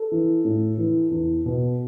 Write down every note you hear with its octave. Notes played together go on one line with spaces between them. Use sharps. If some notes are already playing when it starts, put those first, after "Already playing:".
Already playing: A4
E3
A2
E3
E2
B2